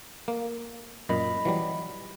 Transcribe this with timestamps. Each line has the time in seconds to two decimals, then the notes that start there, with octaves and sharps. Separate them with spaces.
0.28 A#3
1.09 F#2 A#2 D#5 B5
1.45 E3 F#3 G3